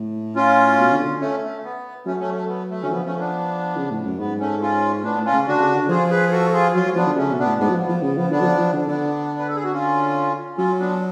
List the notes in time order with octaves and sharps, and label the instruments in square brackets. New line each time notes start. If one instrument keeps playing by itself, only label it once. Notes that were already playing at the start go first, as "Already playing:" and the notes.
Already playing: [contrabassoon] A2
[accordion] C#4 F4
[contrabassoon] B2
D3
D3
[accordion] A3 C#4
A3
B3
[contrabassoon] F#3 [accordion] A3 C#4
[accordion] A3 C#4
A3
B3
A3
[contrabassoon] D3 [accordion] C#4
[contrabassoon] F3 [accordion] B3
[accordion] A3 C#4
B3 D4
[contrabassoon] C#3
A2
F#2
[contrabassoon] G#2 [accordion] B3
[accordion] A3 C#4
C#4 F4
[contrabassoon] A2 [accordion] B3 D4
[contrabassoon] A2
[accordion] C#4 F4
[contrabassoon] C#3
[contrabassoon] D3 [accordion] D4 F#4
[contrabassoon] C#3
D3
[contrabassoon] F3 [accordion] F4 G#4
[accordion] G#4 B4
F#4 A4
F4 G#4
[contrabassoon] F#3 [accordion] C#4 F4
[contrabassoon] F#3
[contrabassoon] F3 [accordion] B3 D4
[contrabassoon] D3
[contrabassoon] C#3 [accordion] A3 C#4
[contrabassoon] B2
[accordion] B3 D4
[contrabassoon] A2
[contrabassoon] G#2 [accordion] B3 D4
[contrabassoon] F#3
F3
[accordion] B3
[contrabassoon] F3
[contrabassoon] C#3 [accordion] B3
[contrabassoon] F3 [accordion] B3
[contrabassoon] D3 [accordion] B3 D4
[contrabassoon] F#3
F3
F3
D3
[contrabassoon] D3 [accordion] B3 D4
[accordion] B4
A4
G#4
F#4
C#4 F4
[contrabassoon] F#3 [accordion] C#4 F4
[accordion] B3 D4